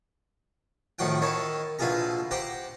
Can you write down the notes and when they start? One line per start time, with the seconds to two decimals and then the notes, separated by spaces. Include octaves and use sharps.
0.99 A2 D#3 F3 F#4 F#5 G5
1.21 D#3 E4 C#5 A5
1.79 A#1 B2 E4 F4 G#4 A#5
2.31 G4 C5 F#5 G5 A#5